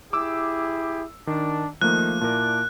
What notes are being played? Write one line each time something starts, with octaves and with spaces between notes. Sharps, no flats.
E4 G4 G#4 D6 E6
D#3 D4
D#3 F3 A3 A#3 F#6
A#2 E4 A#4 D5 A5